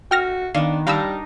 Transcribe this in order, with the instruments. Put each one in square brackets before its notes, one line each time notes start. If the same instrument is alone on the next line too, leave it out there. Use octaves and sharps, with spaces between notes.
[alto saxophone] F#4 [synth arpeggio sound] G5 F6 A#6
[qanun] D#3 B3 [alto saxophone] D4 [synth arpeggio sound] F5
[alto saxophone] G3 [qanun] D4 D#4 A#4 [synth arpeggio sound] F5 B5 E6